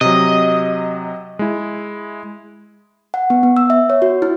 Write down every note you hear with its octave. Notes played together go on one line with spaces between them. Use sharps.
C3 F#3 D#5
G#3 E4
F#5
B3
B3
E6
E5
C#5
F#4
E4